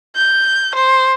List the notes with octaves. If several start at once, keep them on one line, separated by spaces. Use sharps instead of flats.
G6
C5